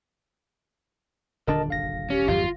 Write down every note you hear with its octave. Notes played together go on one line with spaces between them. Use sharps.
D#1 D3 D4 A#4 D#5 A5
G1 F5 A#6
C#4 G4
G#1 F2 F#3 F4